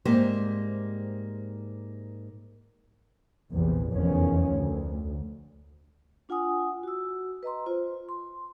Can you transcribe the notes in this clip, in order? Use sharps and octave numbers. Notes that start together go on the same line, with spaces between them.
G#2 G3 A#3 C4 G4 C5
A#1 E2 C3
F1 E2 D#3 F3 C#4
D2
D4 F4 F#5 G#5 D#6
F#4 E6
B4 D#5 A#5 C6
F4 C5
C6